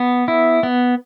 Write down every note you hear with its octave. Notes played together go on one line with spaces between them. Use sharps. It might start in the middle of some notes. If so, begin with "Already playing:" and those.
Already playing: B3
E4
B3